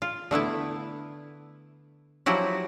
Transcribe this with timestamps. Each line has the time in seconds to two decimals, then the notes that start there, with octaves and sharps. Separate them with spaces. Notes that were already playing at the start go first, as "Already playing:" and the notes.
0.02 F4
0.31 D3 A3 B3 E4
2.26 F3 F#3 E4 F#4 G4